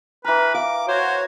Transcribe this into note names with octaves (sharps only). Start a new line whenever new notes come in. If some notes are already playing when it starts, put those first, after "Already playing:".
E3 A#4 B4
F5 D6
F#4 C5 C#5